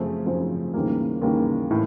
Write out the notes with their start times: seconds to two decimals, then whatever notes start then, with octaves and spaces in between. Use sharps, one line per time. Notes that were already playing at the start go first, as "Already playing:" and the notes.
Already playing: F#2 C#3 F3 A3 C4
0.26 F#2 C#3 F3 A3 C4
0.74 D#2 C#3 E3 G3 A#3
1.22 D#2 C#3 E3 G3 A#3
1.71 A2 E3